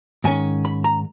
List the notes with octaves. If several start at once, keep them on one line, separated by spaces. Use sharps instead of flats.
G#2 D#3 C#4 G#5
B5
A#5